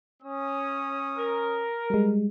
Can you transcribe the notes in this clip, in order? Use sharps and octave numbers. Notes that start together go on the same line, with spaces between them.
C#4 D#6
A#4
G3 G#3